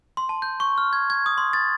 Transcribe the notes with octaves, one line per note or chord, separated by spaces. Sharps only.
C6
A5
G6
C#6
F6
G#6
G#6
D#6
C6
A6